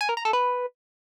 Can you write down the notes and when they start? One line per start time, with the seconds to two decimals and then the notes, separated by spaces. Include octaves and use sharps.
0.01 G#5
0.09 A#4
0.17 A#5
0.25 A4
0.33 B4